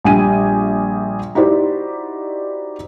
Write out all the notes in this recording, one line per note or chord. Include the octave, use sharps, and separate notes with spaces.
A#1 G3 G5 G#5 D#7
D#4 E4 F#4 G4 C5 D5